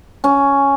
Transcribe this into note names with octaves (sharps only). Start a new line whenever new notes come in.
C#4